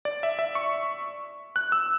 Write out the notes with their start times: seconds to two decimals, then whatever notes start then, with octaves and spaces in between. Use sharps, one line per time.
0.05 D5
0.23 E5
0.39 E5
0.55 C#6
1.56 F#6
1.72 E6